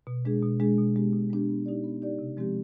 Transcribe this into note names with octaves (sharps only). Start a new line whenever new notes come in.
B2
G#3 D4 G#4
B2
G#3 D4 G#4
B2
G#3 B3 D4 G4
B2
G#3 B3 D4 G4
B3
D#4 G4 D5
B3
D#4 G4 D5
C3
F3 G#3 C4 G4